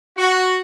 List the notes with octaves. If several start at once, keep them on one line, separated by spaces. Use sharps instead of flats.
F#4